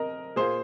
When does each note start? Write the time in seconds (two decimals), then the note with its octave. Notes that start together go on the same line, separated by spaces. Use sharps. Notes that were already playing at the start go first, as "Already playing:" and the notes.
Already playing: C4 A#4 D#5
0.36 A#2 A#3 G#4 C5